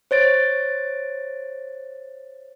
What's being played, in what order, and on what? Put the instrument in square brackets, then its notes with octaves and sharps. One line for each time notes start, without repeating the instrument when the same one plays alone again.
[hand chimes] C5 C#5 A6 D7